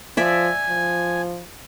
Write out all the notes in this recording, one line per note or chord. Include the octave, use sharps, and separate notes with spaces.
F3 D5 E5 G#5
F3